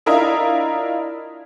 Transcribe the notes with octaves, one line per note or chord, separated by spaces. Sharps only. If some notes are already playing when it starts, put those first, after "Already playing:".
D4 E4 F4 A#4 D#5